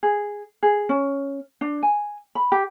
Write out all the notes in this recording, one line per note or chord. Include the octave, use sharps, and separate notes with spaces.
G#4
G#4
C#4
D4
G#5
B5
G4